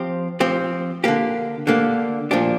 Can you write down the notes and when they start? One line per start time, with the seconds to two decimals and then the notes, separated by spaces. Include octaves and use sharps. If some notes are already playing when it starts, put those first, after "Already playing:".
Already playing: F3 C4 G4
0.40 F3 C4 G4
1.04 D3 A#3 G4
1.67 D3 A#3 G4
2.31 A#2 F3 D4 G4